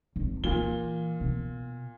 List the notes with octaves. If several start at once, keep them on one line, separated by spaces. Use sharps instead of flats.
G#1
A#2 E3 F4 G7
B2